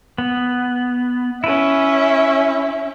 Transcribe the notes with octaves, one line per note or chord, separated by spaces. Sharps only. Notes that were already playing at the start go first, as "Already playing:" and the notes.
B3
C#4 E4 B4 E5